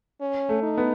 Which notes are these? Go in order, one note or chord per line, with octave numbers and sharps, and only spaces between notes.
C#4
A3
D#4
B3